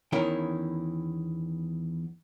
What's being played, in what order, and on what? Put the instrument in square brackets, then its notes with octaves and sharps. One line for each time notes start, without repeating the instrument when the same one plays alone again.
[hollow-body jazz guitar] E2 D#3 C#4 E4 A#4 G5